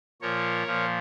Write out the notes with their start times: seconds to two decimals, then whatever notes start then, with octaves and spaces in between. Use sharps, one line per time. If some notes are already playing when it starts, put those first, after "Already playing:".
0.21 A#2 F3 A#4 C#5
0.67 A#2 F3